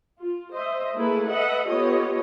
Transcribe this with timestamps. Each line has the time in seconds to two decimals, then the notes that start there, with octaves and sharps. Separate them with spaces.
0.21 F4
0.54 C5 D#5 E5
0.96 A3 A#3 E4 G#4 A4 B4
1.29 A4 B4 D#5 E5 F#5
1.68 B3 F4 G4 A4 C#5 D#5